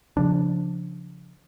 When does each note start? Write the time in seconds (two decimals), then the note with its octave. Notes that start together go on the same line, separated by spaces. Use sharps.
0.17 C#3 F3 D4